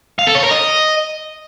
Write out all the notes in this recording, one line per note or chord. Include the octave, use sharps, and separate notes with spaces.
F5
A4
C#5
A#4
D#5